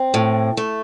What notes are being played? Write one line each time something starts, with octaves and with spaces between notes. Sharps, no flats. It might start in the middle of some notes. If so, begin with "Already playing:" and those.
Already playing: C4
A2
A3